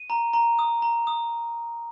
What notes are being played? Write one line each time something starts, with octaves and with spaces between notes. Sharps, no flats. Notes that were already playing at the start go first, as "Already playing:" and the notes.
Already playing: D#7
A#5
A#5
D#6
A#5
D#6